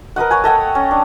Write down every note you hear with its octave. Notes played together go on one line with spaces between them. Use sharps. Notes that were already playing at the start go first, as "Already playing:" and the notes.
A#4 B4 D#5 F#5
C#5 F#5 G#5
A4 D#5 F#5 G5
C#4
D4